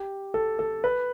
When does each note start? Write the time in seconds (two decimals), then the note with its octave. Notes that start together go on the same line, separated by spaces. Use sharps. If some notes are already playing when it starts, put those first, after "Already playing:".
Already playing: G4
0.34 A4
0.59 A4
0.84 B4